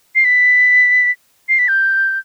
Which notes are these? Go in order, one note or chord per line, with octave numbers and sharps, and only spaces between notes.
C7
B6
C7
B6
G6